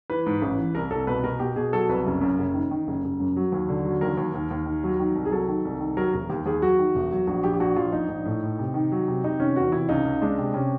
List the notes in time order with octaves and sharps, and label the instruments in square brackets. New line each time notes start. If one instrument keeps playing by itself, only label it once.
[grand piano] E3 B4
G#2
A1
E3
C2 A#4
C2 A4
B2 B4
B2 A#4
B2 G4
B2 G#4
F#3 A4
C2 B4
F#1
F#2
F#1
D#3
D#3
F#1
F#1
F#2
F#3
D#2
D3
F#3
D#2 A#4
D#2
D#2
D#2
D#3
F#3
D#3
C2
G#4
F#3 A4
D#3
C2
D#3
F#3 A#4
E1 A#4
D#2 G4
D#2 G#4
F#3 F#4
D#3
E1
F#3
A#1 F#4
A#1 G4
G4
A#1 F#4
A#1 F4
A#1 D#4
A#1
A2
A2
C3
D#3
F#3
C3
C3 D#4
D#3 C#4
E2 F#4
C3 E4
C#2 D#4
C#2
G#3 D4
C3
C3 C#4